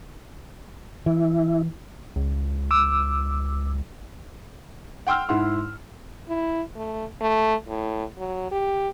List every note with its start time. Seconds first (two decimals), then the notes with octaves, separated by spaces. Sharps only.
1.06 E3 E4
2.16 C#2
2.71 D6 E6
5.07 F#5 G5 C6 E6 F6
5.29 G#2 E4 F#5 C6
6.28 E4
6.75 A3
7.21 A3
7.68 A2
8.18 F#3
8.51 G4